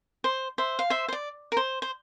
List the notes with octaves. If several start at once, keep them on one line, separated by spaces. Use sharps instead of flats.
C5
C5 E5
F5
C5 E5
C5
D5
A#4
C5
C5